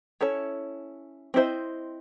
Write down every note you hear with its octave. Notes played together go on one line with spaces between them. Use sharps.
C#4 E4 A4 C#5
C4 E4 A4 C5 D#5